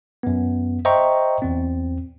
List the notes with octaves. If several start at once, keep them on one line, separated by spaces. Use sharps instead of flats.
F#2 B3
C5 D#5 E5 G5 A#5 C#6
E2 C4